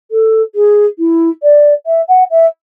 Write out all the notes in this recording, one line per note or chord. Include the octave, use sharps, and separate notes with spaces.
A4
G#4
E4
D5
E5
F#5
E5